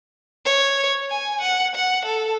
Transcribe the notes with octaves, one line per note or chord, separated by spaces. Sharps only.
C#5
G#5
F#5
F#5
A4